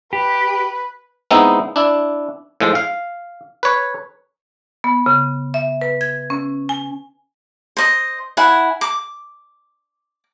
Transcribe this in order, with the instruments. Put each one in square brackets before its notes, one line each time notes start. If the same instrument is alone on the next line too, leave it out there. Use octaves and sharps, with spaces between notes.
[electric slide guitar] G4 [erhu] B4
[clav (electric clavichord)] G#3 B3 C4 D#4 E4
D4 E4
A2 F3 G#3
F5
B4 C#5
[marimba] B3
C#3
E5
B4
G#6
C#4
G#5
[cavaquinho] C5 D#5
E4 F#5 G#5
D6